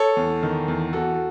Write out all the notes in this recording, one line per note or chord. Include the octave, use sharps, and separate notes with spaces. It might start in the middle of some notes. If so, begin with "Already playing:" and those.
Already playing: A4 C#5
E2
D#3
E2
E2 F#4 A4